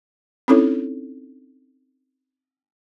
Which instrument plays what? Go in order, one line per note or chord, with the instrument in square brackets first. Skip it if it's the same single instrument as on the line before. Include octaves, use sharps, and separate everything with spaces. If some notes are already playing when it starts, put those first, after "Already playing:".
[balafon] C4 C#4 D#4 E4 A4 C#5